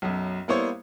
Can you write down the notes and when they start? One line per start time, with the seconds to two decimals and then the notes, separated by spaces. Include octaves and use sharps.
0.02 B1 F#2
0.48 G3 A#3 B3 E4 C5 C#5